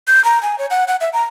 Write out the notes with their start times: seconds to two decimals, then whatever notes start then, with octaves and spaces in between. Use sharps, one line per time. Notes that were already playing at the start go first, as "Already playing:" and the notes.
0.07 G6
0.24 A#5
0.43 G#5
0.58 C#5
0.70 F#5
0.88 F#5
1.01 E5
1.13 A#5